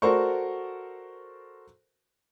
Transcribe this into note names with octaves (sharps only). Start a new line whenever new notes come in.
F#4 A4 A#4 C5 D5 C#6